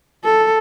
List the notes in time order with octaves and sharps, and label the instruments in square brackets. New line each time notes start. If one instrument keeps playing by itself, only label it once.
[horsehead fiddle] A4